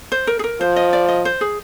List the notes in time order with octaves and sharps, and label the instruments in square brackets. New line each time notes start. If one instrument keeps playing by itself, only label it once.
[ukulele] C5
A#4
G#4
A#4
[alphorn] F3 [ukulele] C5
[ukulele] D#5
D5
D#5
C5
G#4